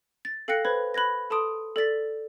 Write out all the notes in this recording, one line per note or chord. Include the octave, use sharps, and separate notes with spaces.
A6
A4 F5 G5 F#6 A#6 C#7
B4 C5 B5 G#6
B5 F#6 G#6 A#6
A4 A5 C6 D#6 D7
A4 D5 A6 B6